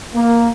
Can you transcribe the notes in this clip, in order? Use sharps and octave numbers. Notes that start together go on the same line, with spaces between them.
A#3